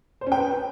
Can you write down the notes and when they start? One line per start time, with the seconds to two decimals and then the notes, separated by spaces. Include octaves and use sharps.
0.21 C5
0.27 C#4
0.32 G5
0.37 B4